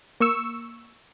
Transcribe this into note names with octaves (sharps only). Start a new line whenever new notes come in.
A#3 C#6 E6